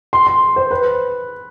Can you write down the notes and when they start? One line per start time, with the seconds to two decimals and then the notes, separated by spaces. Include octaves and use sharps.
0.13 C6
0.27 C6
0.56 C5
0.71 B4